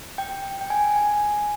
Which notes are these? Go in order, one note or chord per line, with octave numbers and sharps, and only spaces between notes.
G5
G5
G#5
G#5